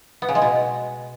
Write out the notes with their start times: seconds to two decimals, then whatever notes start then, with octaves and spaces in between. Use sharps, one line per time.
0.22 B3
0.29 C#3
0.35 G#3
0.42 B2